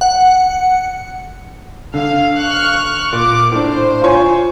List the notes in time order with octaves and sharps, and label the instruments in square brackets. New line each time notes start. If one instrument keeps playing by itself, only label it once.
[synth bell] F#5
[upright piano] D3 [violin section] F5
[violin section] C#6 F6 F#6
[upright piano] A#2 [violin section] D6
[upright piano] A2 D4 [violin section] C5
[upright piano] F4 C#5 G#5